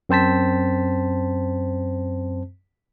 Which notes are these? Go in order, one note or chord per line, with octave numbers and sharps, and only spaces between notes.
F#2 C4 C5 A5 B6